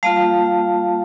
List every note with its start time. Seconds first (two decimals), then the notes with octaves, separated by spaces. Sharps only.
0.03 G3 A#3 F4 F5 A5